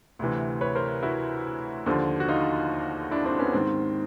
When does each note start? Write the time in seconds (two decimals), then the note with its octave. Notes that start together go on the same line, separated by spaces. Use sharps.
0.19 D2 C3 E3
0.61 B4 C#5
0.75 A#4 C5
1.03 E4 F#4
1.86 D#2 D3 F3
2.20 F#4
2.28 D#4 F4
3.11 D4 E4
3.25 C4 D4
3.39 B3 C#4
3.53 G#2 D#3 C4